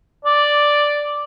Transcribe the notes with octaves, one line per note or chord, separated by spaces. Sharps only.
D5